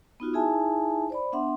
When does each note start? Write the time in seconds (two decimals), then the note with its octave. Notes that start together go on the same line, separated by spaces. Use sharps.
0.20 B3 D#4 F4 F#4
0.33 D#4 E4 G#4 E5 G#5 A5
1.10 C5 D5 B5
1.33 B3 D4 E5 F#5 C6